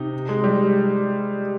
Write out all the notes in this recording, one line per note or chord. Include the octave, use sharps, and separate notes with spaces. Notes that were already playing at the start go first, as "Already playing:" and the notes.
Already playing: C3 D#4
G#3
G3